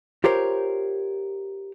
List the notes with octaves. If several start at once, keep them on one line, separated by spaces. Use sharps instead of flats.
F4 G4 A#4 C5 C#5